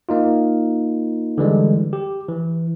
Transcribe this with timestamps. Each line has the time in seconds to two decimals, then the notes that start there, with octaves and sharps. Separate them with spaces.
0.09 A#3 D#4 F4
1.38 D3 E3 G3 G#3
1.93 G4
2.29 E3